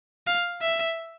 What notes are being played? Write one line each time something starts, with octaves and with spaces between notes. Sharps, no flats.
F5
E5